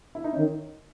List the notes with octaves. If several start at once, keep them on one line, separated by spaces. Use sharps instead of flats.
E4
D#4
D#3 C#4